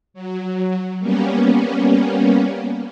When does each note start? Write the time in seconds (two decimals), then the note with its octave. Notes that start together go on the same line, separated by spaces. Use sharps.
0.14 F#3
0.99 G3 A#3 B3 C#4